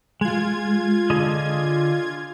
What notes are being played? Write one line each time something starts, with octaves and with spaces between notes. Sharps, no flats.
G#3 F4 G#6
D3 G#4 D#5